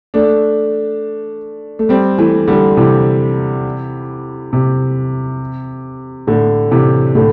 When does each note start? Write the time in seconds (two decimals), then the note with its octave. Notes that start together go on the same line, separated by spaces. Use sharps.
0.14 A3 D4
1.79 A3
1.89 G3 C4
2.18 E3 A3
2.48 D3 G3
2.77 C3 E3
4.53 C3
6.27 A2 D3
6.71 C3 E3
7.15 A2 D3